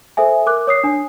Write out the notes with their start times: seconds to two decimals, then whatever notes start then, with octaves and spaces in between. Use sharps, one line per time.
0.17 A4 C5 E5 G#5
0.46 A#4 D6 F#6
0.67 C#5 D#6 C7
0.84 D4 G#5